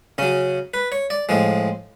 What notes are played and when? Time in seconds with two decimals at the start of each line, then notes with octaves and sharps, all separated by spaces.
0.18 C#3 F#3 C#4
0.74 B4
0.92 C#5
1.10 D5
1.29 A2 F3 G#3